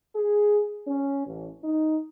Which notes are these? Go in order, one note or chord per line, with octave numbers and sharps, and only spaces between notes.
G#4
C#4
A1
D#4